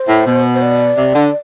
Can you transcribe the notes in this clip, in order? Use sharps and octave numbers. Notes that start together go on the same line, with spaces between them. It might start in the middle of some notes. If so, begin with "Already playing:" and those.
Already playing: C5
A2
B2
C5
D5
C3
D3